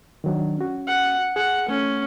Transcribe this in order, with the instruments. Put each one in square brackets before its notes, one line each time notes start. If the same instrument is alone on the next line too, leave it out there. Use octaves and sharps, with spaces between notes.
[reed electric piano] D#3 F#3 D4
C#4 F#4
[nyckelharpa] F#5
[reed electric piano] G#4 [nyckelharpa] F#5
[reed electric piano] A3 [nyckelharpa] C#4